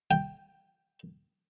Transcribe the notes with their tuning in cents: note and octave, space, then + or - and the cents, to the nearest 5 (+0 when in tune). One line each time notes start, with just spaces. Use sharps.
G5 +0